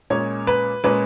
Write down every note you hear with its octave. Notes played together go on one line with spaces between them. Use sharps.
A#2 G#3 C#4 C#5
B4
A#2 G#3 C#4 B4